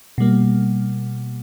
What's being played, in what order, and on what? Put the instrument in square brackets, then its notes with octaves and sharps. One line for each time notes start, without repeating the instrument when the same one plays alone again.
[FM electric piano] B2 G3 A#3